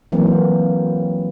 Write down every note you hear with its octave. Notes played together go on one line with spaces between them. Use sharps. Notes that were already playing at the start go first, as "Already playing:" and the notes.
E3 F#3 A#3 C4